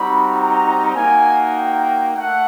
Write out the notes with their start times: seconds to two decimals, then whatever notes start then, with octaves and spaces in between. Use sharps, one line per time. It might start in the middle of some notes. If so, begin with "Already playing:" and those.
Already playing: G3 C4 D#4 F#4 B5
0.36 A#5
0.96 A#3 D#4 F#4 G#5
1.57 G5
2.17 A3 F#5